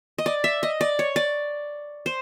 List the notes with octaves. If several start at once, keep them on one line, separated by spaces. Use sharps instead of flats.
D#5
D5
E5
D#5
D5
C#5
D5
C5